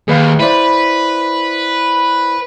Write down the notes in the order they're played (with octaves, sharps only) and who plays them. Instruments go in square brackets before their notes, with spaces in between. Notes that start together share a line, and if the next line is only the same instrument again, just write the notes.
[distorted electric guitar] D#2 [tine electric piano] G#4 B4 F5
[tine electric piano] E4 C5 D5 [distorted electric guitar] B4